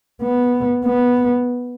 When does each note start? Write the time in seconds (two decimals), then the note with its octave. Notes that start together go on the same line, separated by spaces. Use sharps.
0.22 B3
0.85 B3